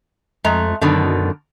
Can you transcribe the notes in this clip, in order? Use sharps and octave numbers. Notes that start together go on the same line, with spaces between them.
F2 G#3 A3 A#5
F#2 B2 D3 D#3